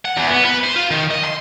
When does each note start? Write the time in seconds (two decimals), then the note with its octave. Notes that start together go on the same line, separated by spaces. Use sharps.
0.05 F#5
0.17 E2
0.30 B3
0.45 B4
0.63 C5
0.76 F4
0.91 D#3
1.11 D#5
1.24 C6